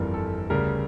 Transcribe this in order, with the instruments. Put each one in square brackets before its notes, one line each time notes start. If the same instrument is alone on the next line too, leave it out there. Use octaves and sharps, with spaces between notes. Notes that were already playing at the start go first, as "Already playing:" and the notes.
Already playing: [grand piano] G1 F2 E3 G3 A#4
A4
D2 C#3 G3 A#4